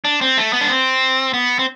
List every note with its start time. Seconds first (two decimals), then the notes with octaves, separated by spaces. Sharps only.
0.05 D4
0.21 C4
0.37 A3
0.53 B3
0.61 D4
0.69 C4
1.34 B3
1.59 C4